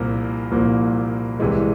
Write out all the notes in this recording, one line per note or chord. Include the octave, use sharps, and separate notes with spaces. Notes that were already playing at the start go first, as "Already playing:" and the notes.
Already playing: C2 A#2 F3 A#3
C2 A#2 F3 A#3
C2 C3 E3 G#3